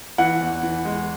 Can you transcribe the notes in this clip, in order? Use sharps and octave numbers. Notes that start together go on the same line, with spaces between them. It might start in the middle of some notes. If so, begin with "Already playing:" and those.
E3 F#5
E2
E3
G#3